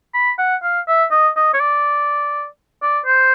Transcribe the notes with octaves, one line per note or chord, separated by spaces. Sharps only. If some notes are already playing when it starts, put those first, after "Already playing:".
B5
F#5
F5
E5
D#5
D#5
C#5
D5
D5
C5